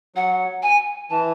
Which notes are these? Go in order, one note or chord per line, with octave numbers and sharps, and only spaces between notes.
F#3 F#5
G#5
E3 A5